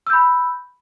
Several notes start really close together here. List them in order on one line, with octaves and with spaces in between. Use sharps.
E6 G6 B5